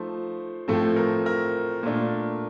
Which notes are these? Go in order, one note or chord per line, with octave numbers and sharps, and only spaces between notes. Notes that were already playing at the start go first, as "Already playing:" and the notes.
Already playing: F3 A3 D#4 C5
A2 F3 A3 C4 A4
A#4
A#4
A#2 A3 D4